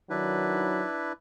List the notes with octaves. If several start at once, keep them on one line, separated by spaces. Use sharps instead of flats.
D#3 F#3 D4 E4 B4